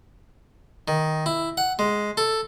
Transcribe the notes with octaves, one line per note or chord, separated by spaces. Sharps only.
D#3
E4
F#5
G#3
A4